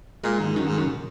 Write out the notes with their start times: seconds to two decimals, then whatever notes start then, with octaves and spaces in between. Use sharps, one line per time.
0.24 A#2 G#3
0.40 G#2 D#3
0.56 F#2 D#3
0.66 G#2
0.77 F#2
0.83 C#3
0.88 A#2